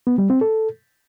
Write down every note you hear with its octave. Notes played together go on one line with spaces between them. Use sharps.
B3
G3
C4
A4